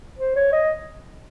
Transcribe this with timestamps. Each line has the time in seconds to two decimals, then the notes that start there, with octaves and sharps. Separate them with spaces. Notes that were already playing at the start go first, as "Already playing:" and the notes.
0.19 C5
0.36 C#5
0.52 D#5